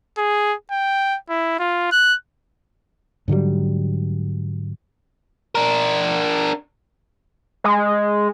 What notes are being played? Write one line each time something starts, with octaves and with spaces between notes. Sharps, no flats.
G#4
G5
E4
F4
F#6
G#2 D3 F#3 G3
D4 A#4
G#3